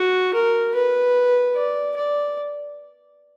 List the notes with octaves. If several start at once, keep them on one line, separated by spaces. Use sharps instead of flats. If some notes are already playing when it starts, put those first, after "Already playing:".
Already playing: F#4
A#4
B4
D5
D5